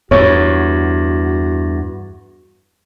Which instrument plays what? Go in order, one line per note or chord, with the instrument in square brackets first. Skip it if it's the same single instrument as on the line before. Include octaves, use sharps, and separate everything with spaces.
[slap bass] E2 G2 [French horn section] F#4 [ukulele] C#5